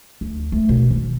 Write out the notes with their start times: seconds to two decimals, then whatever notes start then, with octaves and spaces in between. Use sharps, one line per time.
0.21 D2
0.52 A3
0.69 B2
0.90 D#3